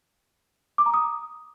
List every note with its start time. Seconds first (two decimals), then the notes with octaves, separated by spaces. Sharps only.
0.78 D6
0.86 A#5
0.94 D#6